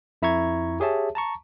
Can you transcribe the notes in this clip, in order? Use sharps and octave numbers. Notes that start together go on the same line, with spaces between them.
F2 E4 E5 A#5 C#6 G#6
G4 G#4 C#5 E5 A5
A5 A#5 C#6